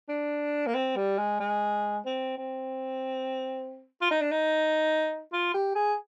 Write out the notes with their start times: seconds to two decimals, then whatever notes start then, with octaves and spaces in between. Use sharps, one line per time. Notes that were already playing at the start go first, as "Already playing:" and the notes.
0.09 D4
0.67 A#3
0.74 C4
0.96 G3
1.18 G#3
1.40 G#3
2.05 C4
2.38 C4
4.01 F4
4.11 D#4
4.21 D4
4.32 D#4
5.32 F4
5.54 G4
5.75 G#4